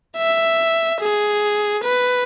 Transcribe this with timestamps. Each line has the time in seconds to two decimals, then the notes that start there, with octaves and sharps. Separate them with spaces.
0.17 E5
1.01 G#4
1.85 B4